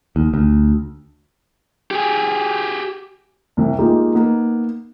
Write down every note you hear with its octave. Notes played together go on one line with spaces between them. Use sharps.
D#2
D2
G4 G#4
C2 C3
G#3 A#3 D#4 F4 G4
A#3 B3 D#4